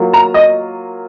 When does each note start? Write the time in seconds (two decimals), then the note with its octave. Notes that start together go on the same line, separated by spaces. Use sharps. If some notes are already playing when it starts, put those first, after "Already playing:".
Already playing: F#3 A#3 F4
0.13 A#5
0.34 D#5